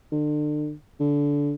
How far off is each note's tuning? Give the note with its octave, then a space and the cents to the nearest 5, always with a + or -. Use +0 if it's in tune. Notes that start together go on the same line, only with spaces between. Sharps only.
D3 +35
D3 -20